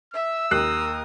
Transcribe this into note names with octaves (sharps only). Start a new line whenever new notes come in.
E5 E6
D#2 A#4 D#6 F#6 C7